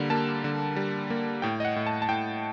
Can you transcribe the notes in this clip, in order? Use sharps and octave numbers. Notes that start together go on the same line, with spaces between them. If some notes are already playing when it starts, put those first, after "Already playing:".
Already playing: D3 G3 A#3
A#3 A5
D3
G3
A#3
A2 G5
D#5
F#5
A2
A5
A5
A2 G5